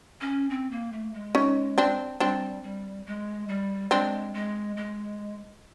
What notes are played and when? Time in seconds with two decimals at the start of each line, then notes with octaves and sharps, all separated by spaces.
0.21 C#4
0.50 C4
0.71 A#3
0.92 A3
1.14 G#3
1.35 C#4 D#4
1.78 C4 D4
2.20 G3 C4 D4
2.63 G3
3.06 G#3
3.48 G3
3.91 G#3 C4 D4
4.34 G#3
4.77 G#3